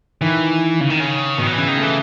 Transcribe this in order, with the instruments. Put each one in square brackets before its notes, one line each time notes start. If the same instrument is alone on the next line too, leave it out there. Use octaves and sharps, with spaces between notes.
[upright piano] D#3 [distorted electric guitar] E3
[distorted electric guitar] C#3
D#3
C#3
[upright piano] B2 [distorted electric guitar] D#3
[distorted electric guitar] F#3
E3
[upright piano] C#3
[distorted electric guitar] D#3
[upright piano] A3
[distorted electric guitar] E3